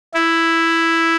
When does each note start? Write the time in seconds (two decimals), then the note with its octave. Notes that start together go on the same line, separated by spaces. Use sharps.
0.14 E4